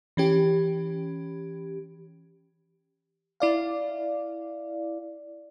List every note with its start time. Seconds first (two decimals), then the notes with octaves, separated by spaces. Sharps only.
0.17 E3 C#4 G4
3.40 E4 D5 F5